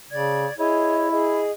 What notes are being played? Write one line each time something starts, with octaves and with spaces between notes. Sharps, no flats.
C#3 D5 G#6
E4 G#4 C#5 D#5
G#4 D#5